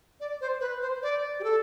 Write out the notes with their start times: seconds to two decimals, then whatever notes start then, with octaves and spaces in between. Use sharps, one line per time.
0.20 D5
0.41 C5
0.60 B4
0.82 C5
1.03 D5
1.40 G4
1.44 A4